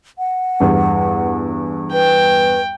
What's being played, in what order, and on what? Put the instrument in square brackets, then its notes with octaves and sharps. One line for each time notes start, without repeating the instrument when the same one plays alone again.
[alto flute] F#5
[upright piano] E2 G2
[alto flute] B4 [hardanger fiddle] G5